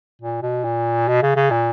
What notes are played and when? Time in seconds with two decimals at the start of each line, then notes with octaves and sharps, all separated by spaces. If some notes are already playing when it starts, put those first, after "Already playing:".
0.21 A#2
0.42 B2
0.64 A#2
1.08 B2
1.22 C#3
1.36 C#3
1.51 A#2